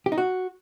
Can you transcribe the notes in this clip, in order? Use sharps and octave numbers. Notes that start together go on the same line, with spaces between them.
G4
D#4
F#4